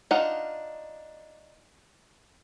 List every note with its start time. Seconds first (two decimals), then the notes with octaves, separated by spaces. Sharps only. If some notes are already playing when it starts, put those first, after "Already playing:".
0.11 D4 D#4 F4 F5 F#5